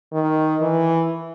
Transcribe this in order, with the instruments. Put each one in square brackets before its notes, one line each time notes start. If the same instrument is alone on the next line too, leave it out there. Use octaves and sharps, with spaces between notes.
[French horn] D#3
E3